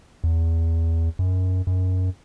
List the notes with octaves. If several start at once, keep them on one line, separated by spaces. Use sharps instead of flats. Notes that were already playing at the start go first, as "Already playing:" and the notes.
E2
F#2
F#2